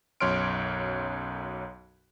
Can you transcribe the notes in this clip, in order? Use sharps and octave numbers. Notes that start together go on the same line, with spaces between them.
B1 F#2 C#5 C6 F6 D7